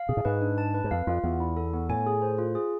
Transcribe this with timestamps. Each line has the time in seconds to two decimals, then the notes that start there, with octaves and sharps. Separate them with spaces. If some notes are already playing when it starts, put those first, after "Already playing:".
Already playing: F5
0.09 B2 G#4
0.17 A2
0.25 G#2 B4
0.41 D4
0.58 A5
0.74 B4
0.84 G#2
0.91 F2 F5
1.07 F2 F4
1.24 E2 B3
1.40 E4
1.57 A4
1.73 B3
1.89 A2 G#5
2.07 G#4
2.22 C5
2.38 F4
2.55 G#4